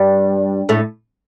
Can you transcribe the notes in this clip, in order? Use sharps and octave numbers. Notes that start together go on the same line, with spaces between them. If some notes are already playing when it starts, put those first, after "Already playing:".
Already playing: G2 G3
A2 A3